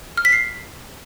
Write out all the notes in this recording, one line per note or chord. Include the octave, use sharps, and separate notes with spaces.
F6
B6
C7